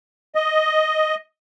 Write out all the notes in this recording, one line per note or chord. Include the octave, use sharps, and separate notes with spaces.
D#5